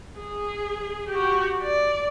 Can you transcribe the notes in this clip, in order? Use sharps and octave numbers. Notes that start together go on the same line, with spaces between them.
G#4
F#4 G4
D5